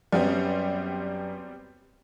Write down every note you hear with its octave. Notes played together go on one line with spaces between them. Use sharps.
F#2 G3 B3 C4